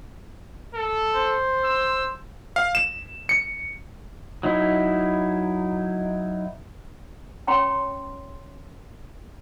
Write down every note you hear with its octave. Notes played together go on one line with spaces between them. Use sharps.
A4
C5
E6
F5
E7
C#7
F#3 D#4 E4
C#4 C#5 G5 A#5 C6 C#6